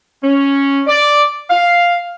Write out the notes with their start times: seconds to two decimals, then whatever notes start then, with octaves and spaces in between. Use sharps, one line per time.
0.23 C#4
0.87 D5
1.49 F5